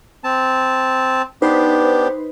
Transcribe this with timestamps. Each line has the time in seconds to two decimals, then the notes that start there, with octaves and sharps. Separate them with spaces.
0.24 C4 A5
1.42 B3 D4 D#4 G4 B4 C5